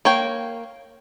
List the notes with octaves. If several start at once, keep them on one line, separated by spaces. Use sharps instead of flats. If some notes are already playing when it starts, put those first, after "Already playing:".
A#3 C#5 G5